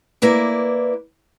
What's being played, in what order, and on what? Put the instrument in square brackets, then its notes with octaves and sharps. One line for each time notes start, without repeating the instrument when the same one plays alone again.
[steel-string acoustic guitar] A#3 E4 B4 D5